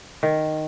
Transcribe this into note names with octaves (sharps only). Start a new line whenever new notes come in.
D#3